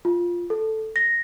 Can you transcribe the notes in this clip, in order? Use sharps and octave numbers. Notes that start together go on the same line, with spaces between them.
F4
A4
A#6